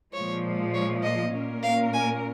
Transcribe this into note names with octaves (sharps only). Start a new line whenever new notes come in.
A#2 F3 G#3 C#5
C#5
D#5
A#2 A#3 C#4 A#4
F5
G#5